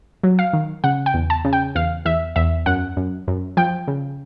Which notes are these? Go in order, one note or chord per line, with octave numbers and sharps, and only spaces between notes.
F#3
F5
D#3
C#3 F#5
G5
E2
A5
C#3
G5
E2 F5
E2 E5
E2 E5
F#2 F#5
F#2
F#2
F3 G5
C#3